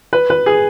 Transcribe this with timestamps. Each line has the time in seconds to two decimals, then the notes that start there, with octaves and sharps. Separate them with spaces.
0.13 B4
0.30 B4
0.46 G#4